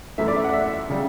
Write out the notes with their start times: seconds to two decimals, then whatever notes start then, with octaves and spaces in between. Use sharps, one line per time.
0.18 F#2 E3 A3 E5
0.28 D5
0.36 E5
0.44 F#5
0.53 E5
0.90 C#3 G3